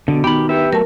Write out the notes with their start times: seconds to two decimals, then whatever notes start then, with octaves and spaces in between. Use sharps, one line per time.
0.08 B2 D3
0.24 D#3 B3 G4 B5
0.49 G4 B4 E5
0.73 F#3 A3 A#4 A5